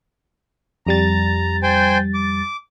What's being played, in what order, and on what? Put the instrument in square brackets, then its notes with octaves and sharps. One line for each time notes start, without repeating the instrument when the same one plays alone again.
[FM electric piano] F2 G3 A6 [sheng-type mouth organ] A#5
[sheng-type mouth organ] C5 G5 G#5
D6